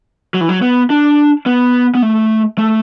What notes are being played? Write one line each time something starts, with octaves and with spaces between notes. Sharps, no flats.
F#3
E3
F#3
B3
D4
B3
B3
A3
A3